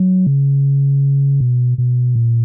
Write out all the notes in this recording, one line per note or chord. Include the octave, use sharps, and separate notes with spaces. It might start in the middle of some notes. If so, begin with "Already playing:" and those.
Already playing: F#3
C#3
B2
B2
A#2